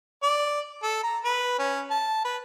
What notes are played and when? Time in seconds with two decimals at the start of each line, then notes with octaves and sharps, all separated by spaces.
0.23 D5
0.83 A4
1.03 A#5
1.24 B4
1.59 C#4
1.90 A5
2.25 B4